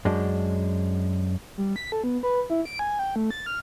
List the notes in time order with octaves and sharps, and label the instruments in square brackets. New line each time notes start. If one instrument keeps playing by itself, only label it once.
[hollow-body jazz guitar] F#2 G#3 D4
[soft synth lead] G3
B6
A4
B3
B4
E4
D7
G#5
G5
A3
A6
F6